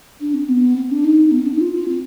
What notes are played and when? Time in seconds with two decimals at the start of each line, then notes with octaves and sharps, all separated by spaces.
0.21 D4
0.34 C4
0.49 B3
0.76 C4
0.91 D4
1.05 D#4
1.31 B3
1.39 C4
1.46 D4
1.54 D#4
1.61 F4
1.75 F4
1.89 C4